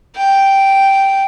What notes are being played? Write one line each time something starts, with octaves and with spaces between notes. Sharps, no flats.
G5